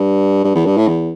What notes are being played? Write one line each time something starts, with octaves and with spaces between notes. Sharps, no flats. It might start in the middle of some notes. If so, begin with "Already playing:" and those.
Already playing: G2
G2
E2
G2
A2
E2